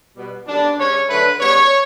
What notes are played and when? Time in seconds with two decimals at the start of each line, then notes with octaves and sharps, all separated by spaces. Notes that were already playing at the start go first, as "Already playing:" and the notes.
0.16 B2 G3 B3
0.46 F#2 D3 G3 B3 D4
0.78 C#3 G3 C#4 C#5
1.08 D3 F#3 A3 B4
1.39 C#3 G3 B3 C#5